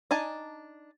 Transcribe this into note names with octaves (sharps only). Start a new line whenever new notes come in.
D4 D#4 G#5 A5